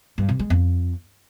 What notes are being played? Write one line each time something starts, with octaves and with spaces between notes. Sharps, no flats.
G2
C3
G#3
F2